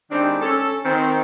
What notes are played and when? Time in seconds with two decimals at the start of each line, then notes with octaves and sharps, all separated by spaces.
0.11 D#3 G#3 C4 D4 G4
0.40 C#4 A4
0.84 D#3 C4